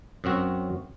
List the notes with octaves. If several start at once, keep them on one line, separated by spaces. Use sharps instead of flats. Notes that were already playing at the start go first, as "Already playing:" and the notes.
F#2 F#3 C4 F#4